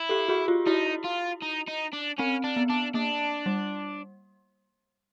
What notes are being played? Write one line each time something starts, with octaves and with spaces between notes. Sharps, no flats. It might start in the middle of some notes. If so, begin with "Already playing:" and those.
Already playing: E4
G4 A4
F#4 G#4
F4 G4
D#4 E4 F#4
F4
D#4
D#4
D4
C4 C#4
D4
B3
D4
A#3 D4
G3